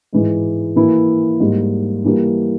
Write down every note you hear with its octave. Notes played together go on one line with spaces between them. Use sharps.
G#2 E3 G#3
E3 A#3 E4
G#2 G3 A#3
E3 G3 A#3